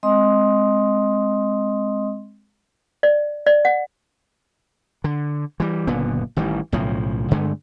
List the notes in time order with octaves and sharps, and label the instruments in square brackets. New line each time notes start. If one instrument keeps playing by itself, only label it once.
[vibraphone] G#3 C4 D#5 C6 D#6
[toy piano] D5
D5
F#5
[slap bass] D3
E3 G3
F#1 A#2 D3 B3
A1 D#3 E3 G3
B1 A2 C#3 F3
G2 D3 G#3 A3